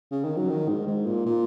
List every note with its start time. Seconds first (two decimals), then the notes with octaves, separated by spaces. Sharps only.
0.11 C#3
0.24 D#3
0.36 F#3
0.49 D#3
0.68 G#2
0.87 G#2
1.06 A#2
1.26 A#2